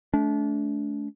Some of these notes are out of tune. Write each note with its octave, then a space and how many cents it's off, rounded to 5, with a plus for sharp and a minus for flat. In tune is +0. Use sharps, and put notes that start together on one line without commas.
A3 -30 D4 -35